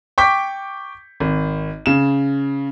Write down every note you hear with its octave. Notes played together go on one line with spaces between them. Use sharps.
G5 C#6 D6 G6 B6
G#1
C#3 E7